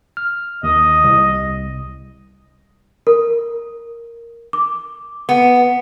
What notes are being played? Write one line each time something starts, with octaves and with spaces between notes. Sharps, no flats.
F6
D#2 D#5
C2
A#4
D6
B3